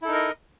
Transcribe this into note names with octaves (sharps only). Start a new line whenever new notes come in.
D#4 E4 A4 A#4 D#5